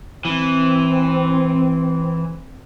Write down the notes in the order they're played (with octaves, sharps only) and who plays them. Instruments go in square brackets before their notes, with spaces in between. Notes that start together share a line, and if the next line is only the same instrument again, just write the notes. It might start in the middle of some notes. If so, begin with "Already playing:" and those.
[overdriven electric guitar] E3 [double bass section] C4